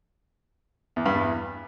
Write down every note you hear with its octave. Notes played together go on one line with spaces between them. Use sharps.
E2
G2
E2